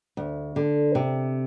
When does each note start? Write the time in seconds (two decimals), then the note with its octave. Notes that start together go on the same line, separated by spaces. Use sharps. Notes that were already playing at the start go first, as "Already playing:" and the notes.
0.17 D2
0.56 D3
0.95 C3